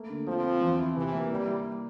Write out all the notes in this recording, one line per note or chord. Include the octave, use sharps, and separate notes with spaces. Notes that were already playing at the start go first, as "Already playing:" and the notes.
Already playing: A3 A#3
D3
F3 C4
C4
E2
E4
C3 E3
A#3
G3 E4
E4